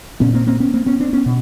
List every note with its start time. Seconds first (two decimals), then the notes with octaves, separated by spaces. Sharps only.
0.20 A#2 B3 C#4
0.34 A#3 C4
0.47 A#3 C4
0.60 B3 C#4
0.74 A#3 C4
0.86 B3 C#4
1.00 C4 D4
1.13 B3 C#4
1.26 B2